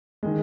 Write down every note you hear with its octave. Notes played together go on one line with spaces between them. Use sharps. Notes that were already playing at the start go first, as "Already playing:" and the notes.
D#3 G#3